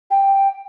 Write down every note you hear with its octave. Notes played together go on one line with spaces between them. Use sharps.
G5